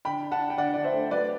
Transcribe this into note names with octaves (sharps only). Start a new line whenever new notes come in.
D3 G5 B5
D4
F#5 A5
D4
G5
D3 D5 F#5
D3 D5
C5 E5
A3
F#3 B4 D5